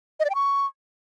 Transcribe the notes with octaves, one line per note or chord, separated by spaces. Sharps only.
D#5
D5
G5
C#6